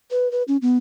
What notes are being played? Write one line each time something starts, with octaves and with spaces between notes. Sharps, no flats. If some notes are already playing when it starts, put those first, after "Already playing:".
B4
B4
C#4
B3